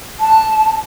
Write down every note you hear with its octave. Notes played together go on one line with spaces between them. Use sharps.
A5